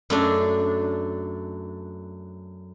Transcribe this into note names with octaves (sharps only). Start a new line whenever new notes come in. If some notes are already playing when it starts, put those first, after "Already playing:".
F#2 A3 D4